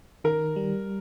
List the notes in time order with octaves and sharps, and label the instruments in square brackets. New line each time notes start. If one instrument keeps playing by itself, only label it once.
[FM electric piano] D#3 [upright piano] A#4
[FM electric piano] G3